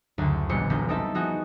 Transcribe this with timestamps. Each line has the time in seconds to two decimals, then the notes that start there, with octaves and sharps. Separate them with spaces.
0.18 F#1 D2
0.49 E1 A#1 G3 B3 C5 C#7
0.70 E1 B1 G6
0.88 C4 D#4 A4 E5 A5
1.15 F3 B3 D#4 F#4 G#4